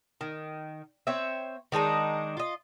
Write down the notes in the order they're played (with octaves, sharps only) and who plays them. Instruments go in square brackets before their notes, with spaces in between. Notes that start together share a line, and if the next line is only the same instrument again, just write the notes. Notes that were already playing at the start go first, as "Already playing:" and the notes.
[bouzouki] D#3
C4 C#5 E5
D#3 G#3 D4 D#4
F4 D#5